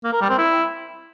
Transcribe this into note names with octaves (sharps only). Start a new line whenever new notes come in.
A#3
A#4
G3
C4
E4